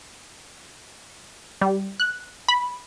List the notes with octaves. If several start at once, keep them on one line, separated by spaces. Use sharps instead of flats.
G3
F#6
B5